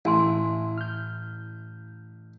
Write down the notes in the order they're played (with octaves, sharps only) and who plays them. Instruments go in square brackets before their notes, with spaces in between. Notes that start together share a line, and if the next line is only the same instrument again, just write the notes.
[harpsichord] A1 [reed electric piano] E4 [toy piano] F5 G#5 C6
[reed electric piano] F6 G6